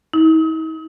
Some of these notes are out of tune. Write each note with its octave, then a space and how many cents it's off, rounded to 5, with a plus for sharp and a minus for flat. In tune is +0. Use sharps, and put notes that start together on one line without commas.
D#4 +45